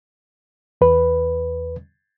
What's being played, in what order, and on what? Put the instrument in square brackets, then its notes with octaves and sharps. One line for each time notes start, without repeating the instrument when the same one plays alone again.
[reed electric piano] E2 B4